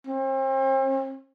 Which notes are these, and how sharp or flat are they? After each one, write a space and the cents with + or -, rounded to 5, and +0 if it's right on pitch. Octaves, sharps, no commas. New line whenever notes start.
C4 +40